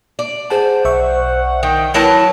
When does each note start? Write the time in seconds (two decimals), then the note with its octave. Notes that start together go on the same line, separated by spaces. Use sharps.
0.19 D5
0.50 G#4 C5 F#5 A5
0.85 B1 E5 F#5 C#6
1.63 D#3 G5
1.94 F#3 E4 A#4 B4 A5